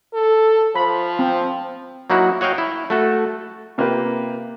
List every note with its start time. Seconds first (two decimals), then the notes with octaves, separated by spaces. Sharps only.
0.14 A4
0.76 F3 B5
1.19 C4
2.10 F#3 A#3 D#4 E4 F#4
2.41 F#4 C#5 D#5 F5 G5
2.58 E4
2.90 A3 F#4 A4
3.78 C3 A#3 F4 G4 B4